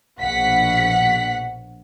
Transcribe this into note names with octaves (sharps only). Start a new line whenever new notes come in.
A#1 B2 F#5 B6